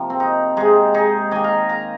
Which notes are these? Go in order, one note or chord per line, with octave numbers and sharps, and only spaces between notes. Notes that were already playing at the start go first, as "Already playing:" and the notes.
Already playing: C3 F3 A#3
C4
D#4
C3 G#3 D#4 G#4
D#4 G#4
D#3 A#3 D#5 G#5
F5 A#5
F5 A#5